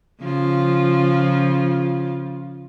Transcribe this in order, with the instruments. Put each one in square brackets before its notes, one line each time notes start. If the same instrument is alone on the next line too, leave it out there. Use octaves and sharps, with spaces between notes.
[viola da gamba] C#3 F3 F4